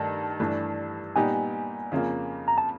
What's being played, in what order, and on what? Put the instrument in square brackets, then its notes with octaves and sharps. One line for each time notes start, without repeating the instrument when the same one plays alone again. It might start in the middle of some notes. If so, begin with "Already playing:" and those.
Already playing: [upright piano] G2 D#3 A3 [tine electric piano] A5
[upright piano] G2 E3 A3 D4
[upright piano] A#2 G3 B3 D#4 G4 [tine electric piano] G#5
[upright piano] F2 C#3 F3 A#3
[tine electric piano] A#5
A5